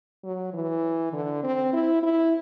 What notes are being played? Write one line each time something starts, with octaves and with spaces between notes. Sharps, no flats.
F#3
E3
D3
C4
E4
E4